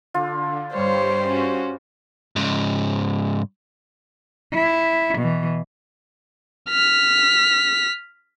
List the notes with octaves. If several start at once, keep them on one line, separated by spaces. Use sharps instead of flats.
D3 F4
G2 G3 C5 C#5 F5
C#4 F#4
G#2 C#3
E4
B2 E3
F6 B6